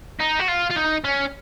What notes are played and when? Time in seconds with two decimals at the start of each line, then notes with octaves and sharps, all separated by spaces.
0.20 D#4
0.40 F#4
0.49 F4
0.71 F4
0.76 D#4
1.05 C#4